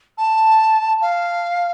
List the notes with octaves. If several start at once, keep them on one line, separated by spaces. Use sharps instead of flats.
A5
F5